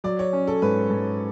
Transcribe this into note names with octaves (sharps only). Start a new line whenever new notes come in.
F#3 D5
C#5
C#4
A4
G#2 B4
G#2